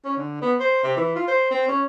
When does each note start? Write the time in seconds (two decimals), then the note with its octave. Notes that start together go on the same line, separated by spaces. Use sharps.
0.05 C#4
0.17 D3
0.42 B3
0.60 C5
0.83 C3
0.97 E3
1.16 F4
1.28 C5
1.51 C4
1.68 C#4